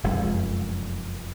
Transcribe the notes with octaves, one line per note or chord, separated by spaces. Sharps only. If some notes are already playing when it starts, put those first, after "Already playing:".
F1 F#2 G#3